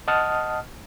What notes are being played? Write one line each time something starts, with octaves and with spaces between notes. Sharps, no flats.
D#5 F#5 A5 D#6 F6